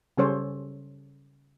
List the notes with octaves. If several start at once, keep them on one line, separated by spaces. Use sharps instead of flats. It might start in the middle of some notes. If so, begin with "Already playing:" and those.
C#3 G3 C#4 A4 C5 C#5